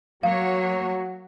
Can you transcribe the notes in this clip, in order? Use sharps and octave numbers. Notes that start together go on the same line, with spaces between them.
F#3 A#3 F#4 C#5 F5